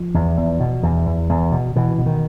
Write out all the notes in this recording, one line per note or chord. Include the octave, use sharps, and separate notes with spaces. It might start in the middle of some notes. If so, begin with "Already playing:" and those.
Already playing: F3
E2
E2
B2
E2
E2
E2
B2
B2 E3
B2
D#3